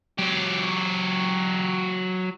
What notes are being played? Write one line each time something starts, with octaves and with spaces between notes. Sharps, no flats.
F#3 G4